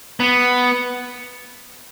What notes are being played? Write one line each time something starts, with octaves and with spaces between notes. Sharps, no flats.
B3